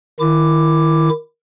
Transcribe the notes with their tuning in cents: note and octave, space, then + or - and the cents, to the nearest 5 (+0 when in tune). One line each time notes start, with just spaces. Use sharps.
D#3 +0 E4 +15 D6 +0